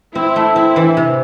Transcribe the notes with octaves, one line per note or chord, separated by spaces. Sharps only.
C4 E4
A3
C4 E4
E3
C3